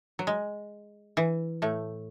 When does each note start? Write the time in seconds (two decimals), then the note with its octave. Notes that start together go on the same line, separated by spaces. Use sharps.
0.19 F#3
0.27 G#3
1.17 E3
1.62 A2 A3